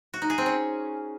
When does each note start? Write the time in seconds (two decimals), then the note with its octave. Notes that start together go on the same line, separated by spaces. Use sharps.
0.14 F#4
0.22 D#4
0.30 G#4
0.38 C4
0.46 C#4